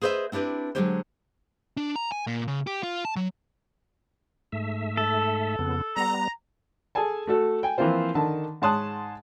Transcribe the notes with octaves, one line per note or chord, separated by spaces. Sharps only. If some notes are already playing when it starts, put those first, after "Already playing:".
G#4 B4 C5 D#5 E5
C4 D4 E4 G4 B4
D3 F#3 G#3 C#4 G4 C5
D4
A#5
G#5
A#2
C#3
G4
F4
A5
F#3
G#2 A3 E5
A4
F2 C#3 B3
G3 B3 A#5
G#4 A4 G#5 A5
A3 F#4 A4
G5 G#5
E3 F3 A#3 C4 F4 C5
D3 D#3 A5
G#2 C#5 A5 C6 D#6 F#6